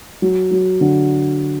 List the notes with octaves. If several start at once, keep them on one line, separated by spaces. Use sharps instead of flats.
F#3
F#3
D3